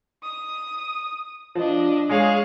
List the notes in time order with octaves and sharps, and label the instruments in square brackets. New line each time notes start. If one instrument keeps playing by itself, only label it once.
[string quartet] D#6
[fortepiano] F3 [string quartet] D4 D#5
[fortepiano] G#3 [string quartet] G#4 C#5 F5